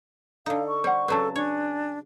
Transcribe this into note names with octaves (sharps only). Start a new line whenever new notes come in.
D3 D#4 A4 F5
C#6
G3 C5 F#5
C#3 F#3 C4 A4 B4 A5
D4 C#5 G#5